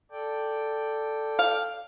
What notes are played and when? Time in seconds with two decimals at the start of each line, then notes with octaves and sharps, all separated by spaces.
0.11 A4 D5 G5
1.39 F5